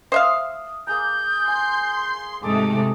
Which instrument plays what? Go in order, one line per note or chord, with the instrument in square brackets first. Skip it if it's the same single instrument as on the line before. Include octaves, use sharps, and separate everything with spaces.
[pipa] C5 E5 F5 [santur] D#6
[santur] A#3 G#4 A#5 [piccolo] G6
[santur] G#5 [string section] C6
[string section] G#2 C3 A3 [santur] G#4 A4 [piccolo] D6